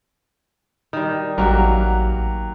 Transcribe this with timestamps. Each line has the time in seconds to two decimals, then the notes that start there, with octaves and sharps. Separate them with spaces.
0.93 D#3 G3
1.38 A1 F#3 A#3 F#4 G4 A#4